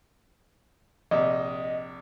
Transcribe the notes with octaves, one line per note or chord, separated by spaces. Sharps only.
A#1 C3 D#5